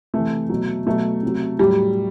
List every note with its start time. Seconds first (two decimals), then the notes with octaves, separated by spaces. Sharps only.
0.14 C3 E3 A3
0.49 B2 F#3
0.86 B2 F#3 A3
1.23 C3 F#3
1.59 A2 F#3 G3